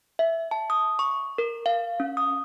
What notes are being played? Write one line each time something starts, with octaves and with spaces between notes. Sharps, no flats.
E5
A5
D#6
C#6
A#4
F5
C#4
D#6